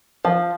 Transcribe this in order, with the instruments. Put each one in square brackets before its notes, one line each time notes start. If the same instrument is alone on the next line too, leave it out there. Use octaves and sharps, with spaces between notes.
[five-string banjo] F3